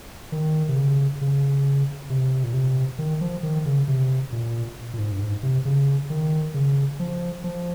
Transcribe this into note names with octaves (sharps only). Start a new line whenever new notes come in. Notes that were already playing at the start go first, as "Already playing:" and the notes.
D#3
C3
C#3
C#3
C3
A#2
C3
D#3
F3
D#3
C#3
C3
A#2
A#2
G#2
G2
G#2
C3
C#3
D#3
C#3
F3
F3